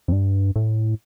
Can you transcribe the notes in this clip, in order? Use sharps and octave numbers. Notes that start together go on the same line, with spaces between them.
F2
G2
A2